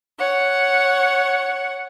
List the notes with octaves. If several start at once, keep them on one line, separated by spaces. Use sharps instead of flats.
C#5 F#5